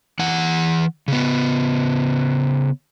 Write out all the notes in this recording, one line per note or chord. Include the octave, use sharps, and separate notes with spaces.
E3 F#5
C#3 B3